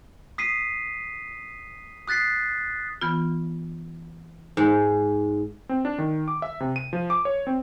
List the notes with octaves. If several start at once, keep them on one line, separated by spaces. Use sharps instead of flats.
D#6 B6 C7 D#7
D#6 F#6 A6 B6 C7
E3 B3 F4
G#2
C4
D4
D#3
D6
E5
C3
D#7
F3
D6
C#5
C4